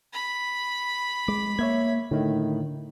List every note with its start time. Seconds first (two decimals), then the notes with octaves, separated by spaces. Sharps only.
0.13 B5
1.28 G#3 D6
1.59 A#3 C#5 E5 G#6
2.11 A2 D3 D#3 A3